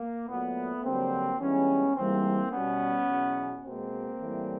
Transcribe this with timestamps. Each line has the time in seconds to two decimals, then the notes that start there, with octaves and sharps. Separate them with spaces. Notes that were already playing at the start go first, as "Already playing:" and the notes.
Already playing: A#3
0.28 A#2 F#3 A3 B3
0.84 G2 D3 F#3 A#3 C4
1.40 G2 E3 G#3 B3 C#4
1.96 G#2 E3 G3 A#3 C4
2.52 B2 G3 B3 C#4
3.08 E2 B2 F#3
3.64 B2 G#3 A#3 C4
4.20 A2 E3 G3